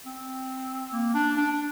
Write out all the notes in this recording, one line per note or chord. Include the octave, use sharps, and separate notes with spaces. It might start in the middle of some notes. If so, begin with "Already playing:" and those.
C4
A#3
D4
D4